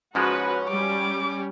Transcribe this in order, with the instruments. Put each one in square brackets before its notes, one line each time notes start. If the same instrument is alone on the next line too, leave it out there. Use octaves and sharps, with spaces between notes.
[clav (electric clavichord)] G#2 F3 G#3 [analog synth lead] C#4 [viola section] F#4 B4
[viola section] G3 [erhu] D6